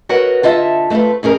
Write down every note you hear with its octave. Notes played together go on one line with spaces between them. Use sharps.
F#4 A#4 B4 C#5 D#5 F#5
D3 F4 D#5 E5 A5
A3 B3 C4 F4 B4
F2 C#4 G#4 A#4